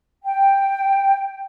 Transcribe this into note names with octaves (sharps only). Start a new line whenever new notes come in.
G5